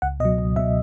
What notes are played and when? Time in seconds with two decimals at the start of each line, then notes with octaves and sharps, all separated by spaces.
0.02 C#2 F#5
0.20 B2 D#5
0.25 F#3
0.38 C#2
0.56 B2 F#3 E5